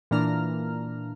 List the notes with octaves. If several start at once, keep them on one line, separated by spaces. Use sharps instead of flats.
A#2 E3 A#3 D4 A#5 F6